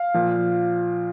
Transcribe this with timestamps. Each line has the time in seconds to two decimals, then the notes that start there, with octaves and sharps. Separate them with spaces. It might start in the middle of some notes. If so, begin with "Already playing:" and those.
Already playing: F5
0.14 A#2 F3